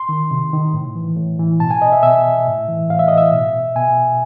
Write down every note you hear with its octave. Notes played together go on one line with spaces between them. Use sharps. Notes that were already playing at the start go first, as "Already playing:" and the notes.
Already playing: C6
D#3
C3
D#3
A2
E3
A2
E3
B2 A5
G#5
D#5
E5
B2 E5
A2
E3
A2 F5
E5
E3 D#5
E5
B2
B2 G#5